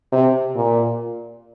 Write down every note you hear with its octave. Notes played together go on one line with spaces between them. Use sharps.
C3
A#2